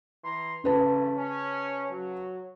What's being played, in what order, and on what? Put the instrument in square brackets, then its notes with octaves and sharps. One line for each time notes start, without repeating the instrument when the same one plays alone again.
[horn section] E3 A#5 C6
[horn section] G2 E3 A3 [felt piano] C#3 B4 A5
[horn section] C#4
F#3